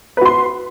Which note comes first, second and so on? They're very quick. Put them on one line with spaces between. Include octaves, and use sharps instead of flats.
B4 F#4 C6